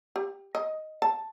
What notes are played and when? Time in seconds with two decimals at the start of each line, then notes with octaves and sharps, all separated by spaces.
0.16 G4
0.55 D#5
1.02 A5